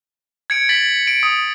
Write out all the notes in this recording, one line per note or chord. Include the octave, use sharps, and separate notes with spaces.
G#6 C#7 D7
A6 B6 F#7
D7
D#6